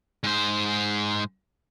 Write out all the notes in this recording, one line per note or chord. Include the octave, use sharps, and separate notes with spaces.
G#2 C5